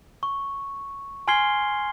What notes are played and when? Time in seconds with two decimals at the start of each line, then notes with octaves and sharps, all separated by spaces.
0.23 C#6
1.28 G#5 C6 F6 G#6 C7 G7